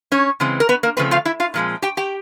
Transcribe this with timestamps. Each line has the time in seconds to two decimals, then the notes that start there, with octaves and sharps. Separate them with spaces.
0.12 C#4 C#5
0.40 C#3 E3 G#3 C4
0.60 A#4
0.69 B3 B4
0.83 A#3 A#4
0.97 C#3 F3 A3 C4 B4
1.11 F4 F5
1.25 E4 E5
1.40 F4 F5
1.54 A#2 F3 G#3 C4
1.82 G4 G5
1.97 G4 G5